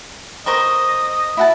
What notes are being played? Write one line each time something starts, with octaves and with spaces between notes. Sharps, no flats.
A#4 C5 D#5 C#6
E4 F#4 A5